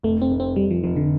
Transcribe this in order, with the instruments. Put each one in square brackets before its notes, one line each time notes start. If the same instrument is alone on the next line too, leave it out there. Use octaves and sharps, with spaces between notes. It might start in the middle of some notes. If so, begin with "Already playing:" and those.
[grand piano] F1 [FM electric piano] A3
[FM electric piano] C4
[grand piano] F1
[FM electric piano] C4
[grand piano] F1 [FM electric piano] G3
[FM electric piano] F3
[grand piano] F1 [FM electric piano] F3
[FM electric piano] D3